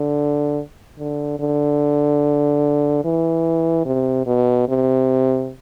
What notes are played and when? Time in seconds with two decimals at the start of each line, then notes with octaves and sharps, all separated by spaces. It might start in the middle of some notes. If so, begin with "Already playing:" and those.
Already playing: D3
0.99 D3
1.39 D3
3.04 E3
3.86 C3
4.26 B2
4.69 C3